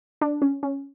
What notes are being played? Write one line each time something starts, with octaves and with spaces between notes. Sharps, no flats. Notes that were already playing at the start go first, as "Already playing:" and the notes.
D4
C#4
C#4